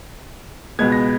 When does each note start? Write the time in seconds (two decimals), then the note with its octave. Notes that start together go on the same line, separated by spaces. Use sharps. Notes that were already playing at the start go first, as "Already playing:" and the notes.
0.79 C#2 B2 G#3 B3 G#6
0.92 A#6